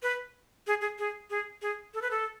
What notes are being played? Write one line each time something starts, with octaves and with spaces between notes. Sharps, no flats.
B4
G#4
G#4
G#4
G#4
G#4
A4
B4
A4